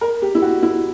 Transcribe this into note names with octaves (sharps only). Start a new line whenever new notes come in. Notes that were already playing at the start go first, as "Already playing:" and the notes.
A#4
G4
E4
F#4
E4